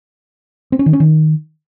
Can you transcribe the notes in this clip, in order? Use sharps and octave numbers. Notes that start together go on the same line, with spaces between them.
C4
C#4
D#3
C#4
D#3